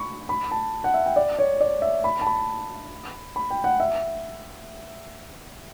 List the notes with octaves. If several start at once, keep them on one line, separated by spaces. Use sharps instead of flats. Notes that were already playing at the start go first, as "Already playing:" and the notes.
Already playing: B5 C#6
B5
A5
F#5
E5
G5
D5
C#5
D5
E5
B5
A5
B5
B5
G5
F#5
E5